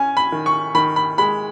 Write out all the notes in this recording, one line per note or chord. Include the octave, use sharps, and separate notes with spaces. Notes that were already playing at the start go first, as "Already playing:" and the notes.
Already playing: C#4 G#5
B5
D#3
C#6
D#3 B5
B5
G#3 B5